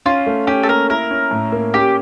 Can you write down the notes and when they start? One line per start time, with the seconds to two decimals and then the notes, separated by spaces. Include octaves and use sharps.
0.06 C#4 F4
0.26 A3
0.47 C#4 G4
0.63 A4
0.68 A#3 A#4
0.89 E4 A#4
1.11 C#4
1.31 A2
1.52 A#3
1.74 C#4 G4